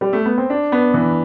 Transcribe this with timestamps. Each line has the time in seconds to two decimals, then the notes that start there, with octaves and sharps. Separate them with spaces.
0.01 G3
0.13 A3
0.26 B3
0.38 C4
0.50 D4
0.72 B3
0.94 E3